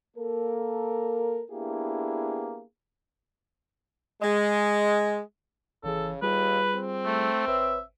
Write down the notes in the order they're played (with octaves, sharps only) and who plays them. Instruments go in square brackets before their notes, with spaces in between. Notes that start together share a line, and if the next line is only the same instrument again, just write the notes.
[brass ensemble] A#3 A4 A#4
A#3 B3 D4 E4 G4 G#4
[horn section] G#3
[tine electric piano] G#1 E3 G#4 [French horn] C#3 [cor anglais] A4
[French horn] D#2 [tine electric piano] G3 F4 G#4 [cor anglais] B4
[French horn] C4
[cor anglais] A3
[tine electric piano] G#1 B4 C#5 [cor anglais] E5